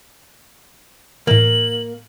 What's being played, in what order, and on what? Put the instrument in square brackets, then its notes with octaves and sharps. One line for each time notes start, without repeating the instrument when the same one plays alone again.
[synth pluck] A2 E3 [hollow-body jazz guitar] A#3 [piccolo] F#7